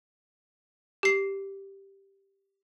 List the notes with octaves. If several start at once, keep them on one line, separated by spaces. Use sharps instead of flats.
G4 C7